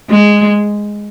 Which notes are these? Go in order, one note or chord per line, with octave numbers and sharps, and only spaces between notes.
G#3